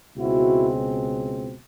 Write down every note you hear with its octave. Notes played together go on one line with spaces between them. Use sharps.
C#2 B2 G#3 C4 E4 F#4